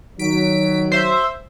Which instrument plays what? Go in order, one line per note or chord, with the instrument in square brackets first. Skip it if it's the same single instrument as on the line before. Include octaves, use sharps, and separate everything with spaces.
[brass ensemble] D#3 F#3 [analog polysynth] B6 D7
[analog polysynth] C5 E5